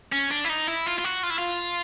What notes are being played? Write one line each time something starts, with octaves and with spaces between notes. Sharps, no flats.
C#4
D4
E4
D#4
E4
F4
F4
F#4
F4
E4
F4